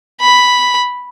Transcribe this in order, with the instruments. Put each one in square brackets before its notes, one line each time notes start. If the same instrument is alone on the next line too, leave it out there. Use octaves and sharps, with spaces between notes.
[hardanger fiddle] B5